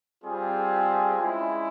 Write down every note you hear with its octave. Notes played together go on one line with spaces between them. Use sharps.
G3 C4 F4 G#4
G#3 C#4 E4